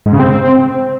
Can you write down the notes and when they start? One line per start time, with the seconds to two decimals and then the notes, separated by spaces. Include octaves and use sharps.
0.06 G#2
0.13 C#3
0.19 C4